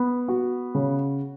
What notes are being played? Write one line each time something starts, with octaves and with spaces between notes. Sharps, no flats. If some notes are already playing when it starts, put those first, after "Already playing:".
Already playing: B3
F#4
C#3